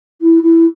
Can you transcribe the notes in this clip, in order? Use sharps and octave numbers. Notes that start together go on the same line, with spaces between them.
E4
E4